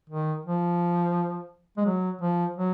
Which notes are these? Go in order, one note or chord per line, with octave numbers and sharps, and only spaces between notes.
D#3
F3
G#3
F#3
F3
F#3